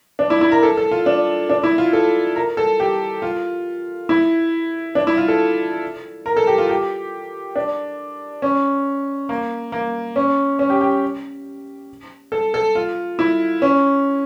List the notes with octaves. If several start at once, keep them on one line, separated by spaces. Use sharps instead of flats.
D4
E4
E4
A#4
A4
A4
F4
D4
D4
E4
F4
A4
A#4
A4
G4
F4
E4
D4
E4
F4
A4
A#4
A4
G4
F4
G4
D4
C#4
A#3
A#3
C#4
C#4
G4
G4
A4
A4
F4
E4
C#4